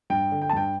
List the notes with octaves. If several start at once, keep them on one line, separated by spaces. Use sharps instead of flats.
G2 G5
D3
G5
A5
G2 G5